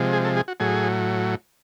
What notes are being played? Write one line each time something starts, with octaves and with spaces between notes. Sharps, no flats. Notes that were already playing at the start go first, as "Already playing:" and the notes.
Already playing: C3 F3 G#3
G#4
A4
G#4
F#4
A2 F#3 G#4